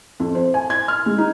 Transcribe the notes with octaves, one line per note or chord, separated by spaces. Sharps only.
F2
C5
G#5
G#6
F6
G#3
D#4